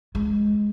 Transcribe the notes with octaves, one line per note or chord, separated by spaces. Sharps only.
G#3